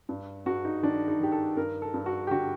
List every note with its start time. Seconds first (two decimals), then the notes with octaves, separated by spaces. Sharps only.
0.09 G2
0.46 G2 F#4
0.65 D#4
0.83 D#3 D4
1.08 D#4
1.20 D#3 G4
1.32 A4
1.57 G2 A#4
1.82 A4
1.94 G2
2.06 F#4
2.27 G4
2.31 D3 F#4